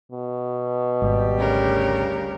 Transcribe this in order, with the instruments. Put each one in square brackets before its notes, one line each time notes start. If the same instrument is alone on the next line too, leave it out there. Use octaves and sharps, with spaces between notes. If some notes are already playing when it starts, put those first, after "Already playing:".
[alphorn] B2
[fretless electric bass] G#1 [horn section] G3 G4
[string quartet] D2 C#3 A#4